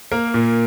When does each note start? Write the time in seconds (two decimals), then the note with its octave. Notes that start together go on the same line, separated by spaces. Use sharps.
0.12 A#3 A#4
0.34 A#2